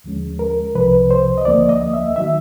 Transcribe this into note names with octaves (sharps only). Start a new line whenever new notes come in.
D#2 D3 F3 G#3 C#4
A#4
C2 C3 F3 B4
C5
D#5
D2 D3 F3 A#3 D5
D#5
E5
D#3 F#3 E5